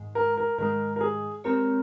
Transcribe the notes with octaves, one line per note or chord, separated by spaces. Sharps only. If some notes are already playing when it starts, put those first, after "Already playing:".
Already playing: G#2 D#3 G#3
A#4
A#4
G#2 D#3 G#3 A#4
A#4
G#4
G#3 C4 G4 A#4 C#5